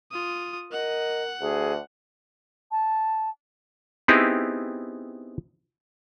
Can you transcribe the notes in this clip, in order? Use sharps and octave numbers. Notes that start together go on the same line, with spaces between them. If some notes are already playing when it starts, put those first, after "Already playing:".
F4 D#6
A#4 D#5 F#5
D2 G#4
A5
B3 C4 D#4 E4 G4 G#4